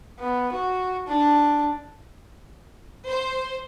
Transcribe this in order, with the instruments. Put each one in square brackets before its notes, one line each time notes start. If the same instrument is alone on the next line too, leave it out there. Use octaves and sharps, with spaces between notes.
[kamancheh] B3
F#4
D4
[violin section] C5